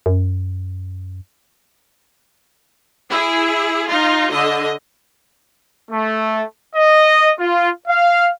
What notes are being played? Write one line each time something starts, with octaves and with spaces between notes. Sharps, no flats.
F#2
E4 G#4
D#4 F4
D3 D#5
A3
D#5
F4
F5